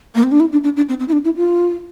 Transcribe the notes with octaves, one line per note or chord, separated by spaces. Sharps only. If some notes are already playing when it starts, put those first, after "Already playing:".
A#3
C4
D4
E4
D4
D4
D4
C4
C4
E4
D4
E4
F4